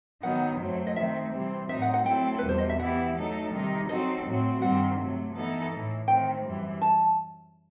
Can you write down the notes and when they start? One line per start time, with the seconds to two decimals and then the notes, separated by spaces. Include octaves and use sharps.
0.23 D#3 F#3 B3 D#4 F#5
0.60 F#2 F#3 A3 C4
0.87 D#5
0.96 D#3 A3 C4 E5
1.32 C3 E3 G3 C4
1.69 A2 F#3 C4 D#4 E5
1.82 F#5
1.94 F#5
2.06 F#3 A3 C4 E4 A4 G5
2.38 E2 B2 G3 B4
2.49 C5
2.58 D#5
2.69 E5
2.79 E3 B3 E4 G4 F#5
3.15 F#3 A3 D#4 A4
3.52 C3 D#3 G3 D#4
3.89 F#3 C4 D#4 F#4 A4 D#5
4.26 A2 F#3 C4 F#4
4.61 G2 D#3 G3 C4 F#5
4.98 C3 F#3 A3
5.36 E3 B3 D#4 A4
5.71 A2 E3 A3
6.08 D#3 A3 C4 G5
6.45 F#2 E3 G3
6.81 A5